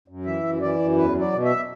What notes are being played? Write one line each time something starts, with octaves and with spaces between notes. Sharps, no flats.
F#2
E3 E5
F#2
E3 D5
F#2
E2 B4
F#3
D5
B2
E5